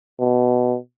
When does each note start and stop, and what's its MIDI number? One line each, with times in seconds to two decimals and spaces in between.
0.20 0.77 47